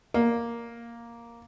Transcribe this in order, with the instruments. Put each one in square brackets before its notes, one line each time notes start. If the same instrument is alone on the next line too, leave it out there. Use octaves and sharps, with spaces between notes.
[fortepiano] A#3